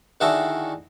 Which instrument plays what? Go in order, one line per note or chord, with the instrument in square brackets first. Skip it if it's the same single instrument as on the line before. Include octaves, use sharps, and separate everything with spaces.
[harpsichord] D3 D#3 E4 F#4 G#4 A4